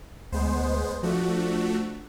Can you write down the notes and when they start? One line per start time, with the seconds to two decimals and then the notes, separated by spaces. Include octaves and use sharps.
0.32 D2 G#3 B3 C5
1.03 F3 A3 D4 F#4